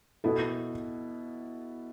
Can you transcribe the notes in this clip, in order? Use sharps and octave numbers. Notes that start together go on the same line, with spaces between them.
B2 B3 E4 A4